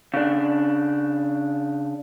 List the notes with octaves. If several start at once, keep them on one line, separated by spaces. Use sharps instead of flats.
C#3 D4